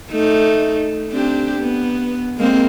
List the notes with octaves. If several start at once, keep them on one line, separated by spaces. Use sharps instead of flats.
A3 D#4
C4 D4 G4
B3
G#3 A#3 C4